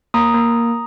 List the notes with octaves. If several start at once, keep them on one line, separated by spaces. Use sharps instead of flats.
A#3 A#5 D#6
A#3